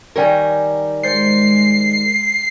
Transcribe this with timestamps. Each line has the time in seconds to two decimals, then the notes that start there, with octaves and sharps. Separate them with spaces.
0.16 D#3 G3 A#4 C#5 G5 G#5
1.03 G#3 C5 A6 C7 C#7